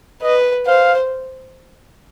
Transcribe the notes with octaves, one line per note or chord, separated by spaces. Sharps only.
B4 D#5
C5 F5